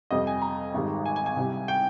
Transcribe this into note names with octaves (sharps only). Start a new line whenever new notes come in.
F2 C3 G3 D#5
G#5
A#5
G#1 G#2 D#3 G3
G#5
G#5
G#5
C2 C3 G3
G5